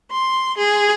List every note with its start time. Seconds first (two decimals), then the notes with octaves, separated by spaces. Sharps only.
0.12 C6
0.57 G#4